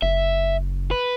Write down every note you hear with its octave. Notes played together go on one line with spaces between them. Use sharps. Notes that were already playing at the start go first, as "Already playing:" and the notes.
F#1 E5
B4